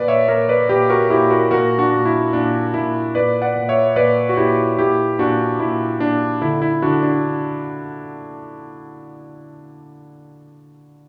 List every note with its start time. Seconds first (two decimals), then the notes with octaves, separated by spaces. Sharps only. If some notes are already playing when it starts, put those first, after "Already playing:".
Already playing: A#2 B4 D5
0.08 C#5 E5
0.28 A#2 A#4 C#5
0.49 B4 D5
0.69 A#2 G4 B4
0.90 F#4 A#4
1.10 A#2 E4 G4
1.30 F#4 A#4
1.51 A#2 F#4 A#4
1.78 D4 F#4
1.92 A#2
2.05 E4
2.33 A#2 D4
2.74 A#2 E4
3.15 A#2 B4 D5
3.42 D5 F#5
3.55 A#2
3.69 C#5 E5
3.96 A#2 B4 D5
4.29 F#4
4.37 A#2 E4 G4
4.78 A#2 E4 G4
5.19 A#2 D4 F#4
5.60 A#2 E4
6.00 A#2 D4
6.42 D3 E4
6.62 E4
6.82 D3 D4 F#4
7.03 D4